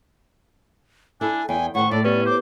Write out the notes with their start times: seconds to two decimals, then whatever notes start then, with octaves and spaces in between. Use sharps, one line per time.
1.21 D4 E4 A4 G#5
1.49 E2 G5 G#5
1.75 A2 D#3 C5 F#5 C#6
1.91 A2 A4 D5
2.05 B3 C#4 G4 B4 D5
2.26 C5 D6